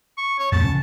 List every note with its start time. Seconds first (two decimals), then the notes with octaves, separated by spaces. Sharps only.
0.17 C#6
0.39 C#5
0.52 F2 A#2 A3 A5
0.64 E2 C#3 C#4